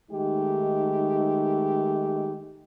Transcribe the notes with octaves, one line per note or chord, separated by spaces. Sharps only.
D#3 G#3 A3 D#4 G4